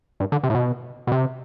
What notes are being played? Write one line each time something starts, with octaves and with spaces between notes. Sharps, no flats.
G2
D3
C3
A2
B2
B2
C3